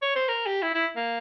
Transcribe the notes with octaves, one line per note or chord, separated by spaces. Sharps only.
C#5
C5
A#4
G4
E4
E4
A#3